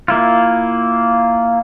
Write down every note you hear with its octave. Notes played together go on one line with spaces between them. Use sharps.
A#3 E4 F4